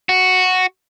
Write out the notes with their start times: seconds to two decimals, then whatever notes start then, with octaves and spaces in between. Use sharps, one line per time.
0.09 F#4